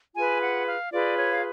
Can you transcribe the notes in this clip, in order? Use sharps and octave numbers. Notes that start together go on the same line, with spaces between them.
F4 G#4 B4 G#5
F#5
F5
F4 G#4 B4 D5
C#5
F5